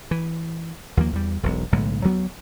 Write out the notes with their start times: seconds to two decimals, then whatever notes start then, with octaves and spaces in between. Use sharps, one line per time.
0.11 E3
0.97 D#2 F3 A#3
1.13 E2 G3
1.43 E1 B1
1.72 B1 A2 D3 G#3
2.04 D2 F#3 B3